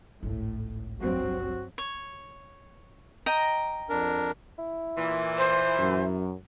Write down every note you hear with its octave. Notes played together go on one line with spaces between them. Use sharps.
G#1 C#2 A2
G2 F#3 C4 F#4
C#5
D#5 G5 A#5
F2 D4 A#4
E4
A#2 E3
C5
F#2